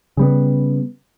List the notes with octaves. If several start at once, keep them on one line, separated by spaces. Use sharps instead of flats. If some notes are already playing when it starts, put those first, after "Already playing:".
C#3 G3 B3